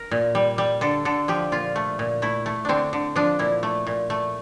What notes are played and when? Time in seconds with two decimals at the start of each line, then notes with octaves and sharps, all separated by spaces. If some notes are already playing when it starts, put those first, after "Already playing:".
Already playing: A#4
0.11 A#2
0.35 G3
0.58 G3
0.81 D3 A4
1.05 D3 A4
1.28 F3 G4
1.52 A#2 F4
1.76 A3
1.99 A#2
2.22 A3 E4
2.46 A3
2.65 D3 C4 D4
2.93 D3
3.16 F3 D4
3.39 A#2 E4
3.63 A3
3.87 A#2
4.10 A3